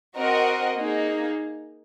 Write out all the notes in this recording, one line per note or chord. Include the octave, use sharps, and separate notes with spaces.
C4 F#4 A#4 D#5 F#5
A#3 D#4 G#4